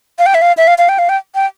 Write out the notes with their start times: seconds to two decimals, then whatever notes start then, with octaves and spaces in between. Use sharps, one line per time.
0.19 F5
0.26 G5
0.34 E5
0.42 F5
0.57 E5
0.67 F5
0.78 F5
0.89 G5
0.98 F5
1.09 G5
1.35 G5